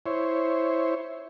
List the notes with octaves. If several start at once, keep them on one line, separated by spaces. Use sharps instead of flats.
E4 C5 C#5